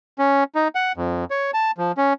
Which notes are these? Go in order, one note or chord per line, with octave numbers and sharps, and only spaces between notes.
C#4
D#4
F#5
F2
C#5
A5
F3
C#4